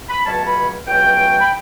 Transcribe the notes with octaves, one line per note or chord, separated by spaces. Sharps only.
B5
C#2 B2 F#3 A3 C#4 A5
B5
C#2 B2 F#3 A3 C#4 G5
B5